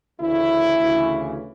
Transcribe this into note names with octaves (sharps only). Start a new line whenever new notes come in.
D2 C#3 E3 E4
D2 C#3 E3